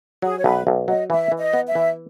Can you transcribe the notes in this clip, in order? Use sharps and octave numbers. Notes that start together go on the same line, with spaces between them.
F#3 G#4
C#5
B1 B4
B1
F#3 D#5
E3 E5
E3
D#5
B3
E5
E3